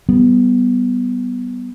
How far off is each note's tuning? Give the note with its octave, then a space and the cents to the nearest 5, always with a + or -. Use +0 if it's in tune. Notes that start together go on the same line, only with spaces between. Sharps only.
G3 -25 B3 +0